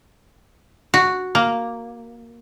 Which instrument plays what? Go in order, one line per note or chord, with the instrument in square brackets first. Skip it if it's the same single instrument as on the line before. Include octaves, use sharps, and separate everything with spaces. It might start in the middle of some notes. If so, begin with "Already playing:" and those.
[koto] F#4
A#3